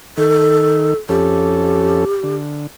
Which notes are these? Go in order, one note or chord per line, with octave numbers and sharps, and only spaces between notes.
D#3 A4
F2 C#4 G4 A4
D3